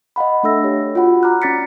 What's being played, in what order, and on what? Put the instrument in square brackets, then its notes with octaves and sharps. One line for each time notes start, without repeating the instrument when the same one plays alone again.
[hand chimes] D#5 F5 F#5 B5
A3 D4 A4 E5 E6 A#6
G4 C#5
F4 F#4 F#5 B5
A#5 D6 F6 F#6
C#4 D5 A6 B6 C#7